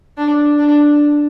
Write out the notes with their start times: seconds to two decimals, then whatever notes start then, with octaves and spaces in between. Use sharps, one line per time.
0.17 D4
0.59 D4